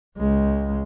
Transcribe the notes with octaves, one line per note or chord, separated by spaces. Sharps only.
C#2 G#3